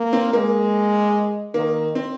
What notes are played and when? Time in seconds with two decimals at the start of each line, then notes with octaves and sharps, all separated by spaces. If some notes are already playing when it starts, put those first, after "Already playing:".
Already playing: A#3
0.13 C4
0.33 G#3 A#3
1.54 D#3 A#3
1.95 C4